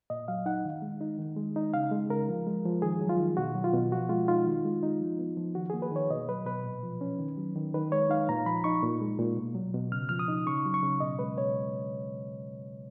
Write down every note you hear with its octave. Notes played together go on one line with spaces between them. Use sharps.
A#2 D#5
F#3 F5
D#4 F#5
D#3
G#3
D#4
D#3
G#3
D#4
C#3 F5
G#3
C#3 A#4
F3
G#3
F3
D#3 G#4
F#3
F4
D#3
B2 F#4
F#3
F4
B2
F3 F#4
G#3 F4
D#4 F4
D#3
G#3
D#4
F3
B3
F3
D#3 F#4
A#3 G#4
B4
D#3 C#5
B2 D#5
F#3 B4
B2 B4
A#2
F3
C#4
D#3
F#3
D#3
D#3 B4
G#3 C#5
D#4 F5
A#2 A#5
F3 B5
D#4 C#6
A#2
G#3
A#2
B2
F#3
B2
C#3 F6
F3 F6
D#6
D#4
C#3 C#6
F#3
C#6
C#3
B2 D#5
G#3 B4
B2 C#5